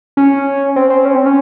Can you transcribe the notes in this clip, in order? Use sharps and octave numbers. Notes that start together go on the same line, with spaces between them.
C#4
C4
C4
C#4
C4
C#4